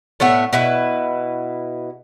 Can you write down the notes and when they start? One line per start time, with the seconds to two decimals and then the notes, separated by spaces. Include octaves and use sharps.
0.20 A2 A3 B3 E5
0.53 B2 E4 B4